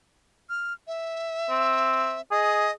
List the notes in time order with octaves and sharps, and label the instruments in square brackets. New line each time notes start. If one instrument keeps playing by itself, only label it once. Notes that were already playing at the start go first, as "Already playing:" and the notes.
[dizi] F6
E5
[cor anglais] C4
[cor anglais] G#4 [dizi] D#5